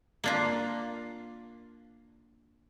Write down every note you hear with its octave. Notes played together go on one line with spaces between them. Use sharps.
A#3 D4 F4